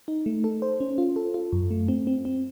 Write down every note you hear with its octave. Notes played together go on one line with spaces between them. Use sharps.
D#4
A3
A4
C5
C#4
F4
A4
F4
F#2
A3
C4
C4
C4